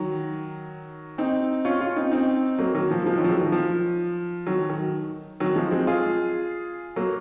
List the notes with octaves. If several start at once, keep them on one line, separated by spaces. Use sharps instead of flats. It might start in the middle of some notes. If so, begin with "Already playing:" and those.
Already playing: D#3 F#3
C4 D#4
C#4 F4
C#4 F4
C4 D#4
C4 D#4
F#3 A#3
D#3 F#3
F3
F3 G#3
D#3 F#3
F3
D#3 F#3
D#3
F3
D#3 F#3
D#3
D#3 F#3
F3 G#3
G#3 C4
F4 G#4
F#3 A#3